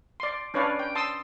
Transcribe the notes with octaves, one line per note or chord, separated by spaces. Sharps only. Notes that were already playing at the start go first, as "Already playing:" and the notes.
D5 C6
C#4 D4 B4 C#5 D5 F5
G5
A5 C6 D#6 E6